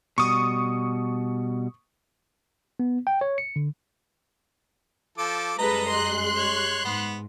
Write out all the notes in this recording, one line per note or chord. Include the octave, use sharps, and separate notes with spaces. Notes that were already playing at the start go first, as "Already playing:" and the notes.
B2 G3 C#6 D#6
B3
G5
C#5
C#7
D3
F3 A4 D6
F#2 G3 G#3 A4 B4 D#5 A#5
C6 F#6
C#5
G#2 B3